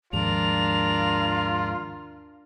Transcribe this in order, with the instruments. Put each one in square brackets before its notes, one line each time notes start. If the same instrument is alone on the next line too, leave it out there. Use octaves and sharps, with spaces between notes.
[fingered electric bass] D#2 G#2 F3 [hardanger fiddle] D4 A#4 [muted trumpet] F4 [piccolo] F7